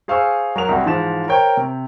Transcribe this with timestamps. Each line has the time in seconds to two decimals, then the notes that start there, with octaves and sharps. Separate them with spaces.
0.08 G#4 C5 F5 G#5 C#6 E6
0.56 F#3 A#4 F7
0.68 C2 G3 F#4
0.85 G#2 E3 F3 E7
1.28 A#4 C5 C#5 G5
1.57 C3